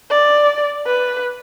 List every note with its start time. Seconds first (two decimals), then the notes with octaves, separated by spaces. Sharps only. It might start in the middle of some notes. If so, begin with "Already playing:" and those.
0.10 D5
0.86 B4